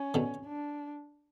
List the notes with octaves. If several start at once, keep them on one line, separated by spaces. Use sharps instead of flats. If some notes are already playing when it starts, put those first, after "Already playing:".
Already playing: C#4
B2 D3
D4